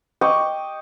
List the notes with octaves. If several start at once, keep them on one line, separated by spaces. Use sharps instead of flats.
D#5 G5 C#6 D6